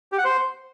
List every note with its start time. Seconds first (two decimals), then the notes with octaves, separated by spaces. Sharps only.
0.12 G4
0.18 F#5
0.24 C5